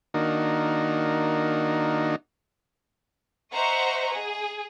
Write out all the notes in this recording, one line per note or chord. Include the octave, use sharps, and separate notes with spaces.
D#3 A#3 D4 D#4 F#4
C5 D#5 E5 F#5 A#5 C#6
G#4